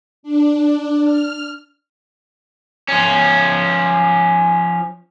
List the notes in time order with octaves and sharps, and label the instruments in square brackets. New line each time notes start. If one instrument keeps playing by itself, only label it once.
[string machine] D4
F6
[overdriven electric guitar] F3 C#4